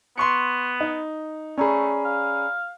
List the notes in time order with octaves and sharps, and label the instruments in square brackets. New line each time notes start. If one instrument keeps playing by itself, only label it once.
[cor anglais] B3 [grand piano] C6 C#6 C#7
[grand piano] D#4
[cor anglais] A3 [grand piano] C#4 G#4 [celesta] D5 A#5 B5
[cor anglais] F5